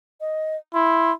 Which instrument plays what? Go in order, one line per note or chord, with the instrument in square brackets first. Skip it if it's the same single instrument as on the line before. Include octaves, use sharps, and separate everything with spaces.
[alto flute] D#5
[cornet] E4 [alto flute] C6